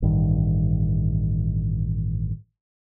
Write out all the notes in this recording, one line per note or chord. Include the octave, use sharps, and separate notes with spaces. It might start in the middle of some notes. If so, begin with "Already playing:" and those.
A1 G2 D#3